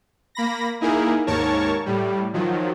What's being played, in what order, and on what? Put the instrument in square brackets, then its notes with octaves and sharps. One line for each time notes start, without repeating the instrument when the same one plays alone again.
[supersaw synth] A#3 B5 A#6
A#3 D#4 E4 G#4 A#4
D#2 G#2 A#4 C#5 A5 C#6
A2 G3
D#3 F3 F#3